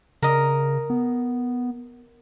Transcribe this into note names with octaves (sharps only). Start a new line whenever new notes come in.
C#3 A#4 D#5
B3